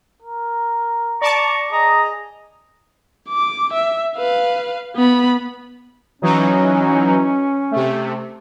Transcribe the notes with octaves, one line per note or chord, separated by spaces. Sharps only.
A#4
D5 A5 A#5 C#6 D6
G#4 D#5 A#5
D6
E5
B4 F5
B3 B5
E3 F#3 C#4 D#4
C3 A3